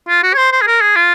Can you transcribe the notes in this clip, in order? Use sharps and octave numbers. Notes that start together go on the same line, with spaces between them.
F4
F#4
C#5
C5
C5
G#4
A#4
G#4
F4